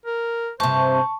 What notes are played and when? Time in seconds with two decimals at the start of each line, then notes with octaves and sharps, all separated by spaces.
0.06 A#4
0.60 G2 C3 C5 A5 C#6